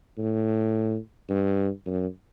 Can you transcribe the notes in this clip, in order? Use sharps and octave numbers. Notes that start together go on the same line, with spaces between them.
A2
G2
F#2